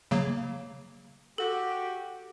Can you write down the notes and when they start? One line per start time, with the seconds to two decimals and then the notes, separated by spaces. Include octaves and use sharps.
0.11 C#3 F#3 A#3
1.38 F#4 G4 A4